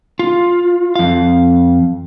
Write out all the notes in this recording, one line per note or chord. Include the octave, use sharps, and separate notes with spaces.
F4
F2 F5